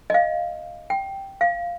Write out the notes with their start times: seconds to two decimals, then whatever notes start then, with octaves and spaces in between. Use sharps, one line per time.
0.10 D#5
0.14 F5
0.90 G5
1.41 F5